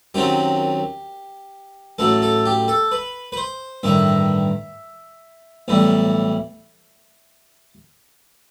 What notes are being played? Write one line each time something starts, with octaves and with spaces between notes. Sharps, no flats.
F#2 D#3 F#3 C4 G4
A1 A2 F#3 A4
A4
G4
A4
B4
B4
C5
A1 G2 D#3 E5
B1 A2 E3 G3